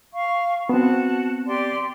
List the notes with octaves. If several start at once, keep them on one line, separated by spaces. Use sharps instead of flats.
F5 C#6
B3 C4 F#4 A5
G4 D5 C6